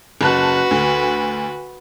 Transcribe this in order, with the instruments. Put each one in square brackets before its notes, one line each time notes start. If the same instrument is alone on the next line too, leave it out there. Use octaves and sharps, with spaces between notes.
[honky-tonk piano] F#1 A5 F#6 [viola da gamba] F#4 B4
[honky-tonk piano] D2